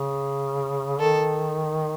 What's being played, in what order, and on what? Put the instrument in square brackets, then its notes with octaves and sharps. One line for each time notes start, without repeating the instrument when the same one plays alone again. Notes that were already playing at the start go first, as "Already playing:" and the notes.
Already playing: [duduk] C#3
[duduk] D#3 [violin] A4